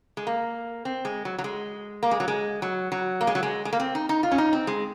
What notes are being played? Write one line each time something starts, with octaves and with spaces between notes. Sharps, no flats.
G#3
A#3
C4
G#3
F#3
F#3
G#3
A#3
G#3
F#3
G#3
F#3
F#3
A#3
G#3
F#3
G#3
G#3
A#3
C4
D#4
D#4
F4
C#4
D#4
C4
G#3